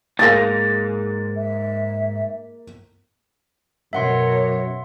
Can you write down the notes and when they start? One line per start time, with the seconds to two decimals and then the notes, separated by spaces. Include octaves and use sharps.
0.19 G#2 A#3 G#4 F5 A6 A#6
1.37 E5
3.93 F#2 B2 C#5 E5 F#5 C6